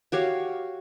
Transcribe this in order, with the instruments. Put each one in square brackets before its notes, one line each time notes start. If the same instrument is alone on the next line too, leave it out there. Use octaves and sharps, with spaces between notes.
[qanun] F#4 G4 C#5 F5